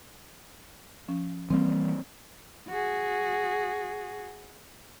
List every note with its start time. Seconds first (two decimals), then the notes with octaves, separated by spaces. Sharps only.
1.08 F3 C#4
1.50 E3 G3 A#3 C4
2.68 F#4 G#4